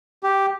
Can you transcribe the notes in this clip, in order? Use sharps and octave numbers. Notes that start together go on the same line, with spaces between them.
G4